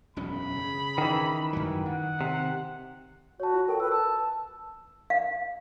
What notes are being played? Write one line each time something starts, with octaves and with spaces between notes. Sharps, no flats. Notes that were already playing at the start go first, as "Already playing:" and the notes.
E1 F#2 C#4 B5
C#3
D#3 E3
F#2 F#3
D#3 F#5
C3
F#4 C#5 A5
F4
A4 A#4 G5
B4 E6
A5 E6
F5